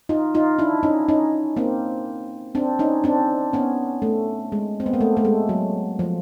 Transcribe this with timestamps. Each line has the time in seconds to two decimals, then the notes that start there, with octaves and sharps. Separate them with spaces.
0.09 D#4 F4
0.35 D#4 F4
0.59 D4 E4
0.83 C#4 D#4
1.08 C#4 D#4
1.57 A#3 C4
2.55 C4 D4
2.79 C#4 D#4
3.04 C4 D4
3.53 B3 C#4
4.02 A3
4.52 G#3
4.80 C4
4.86 B3
4.93 A#3
5.01 A3
5.17 A3
5.25 G#3
5.49 F#3
5.99 F3